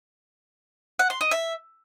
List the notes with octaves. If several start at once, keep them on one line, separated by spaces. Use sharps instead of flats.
F#5
C6
D#5
E5